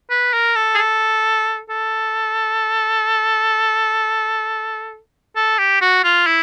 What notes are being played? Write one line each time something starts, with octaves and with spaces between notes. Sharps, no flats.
B4
A#4
A4
G#4
A4
A4
A4
G4
F#4
F4
E4